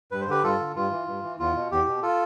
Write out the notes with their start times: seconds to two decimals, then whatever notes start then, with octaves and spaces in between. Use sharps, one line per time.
0.11 G2 B4
0.21 C5
0.28 D3 G4 B4
0.43 G2 F4 A4
0.59 D3
0.76 G2 F4
0.91 E3
1.07 G2
1.23 E3
1.39 E2 F4
1.55 B2
1.71 E2 G4
1.87 B2
2.02 F4 A4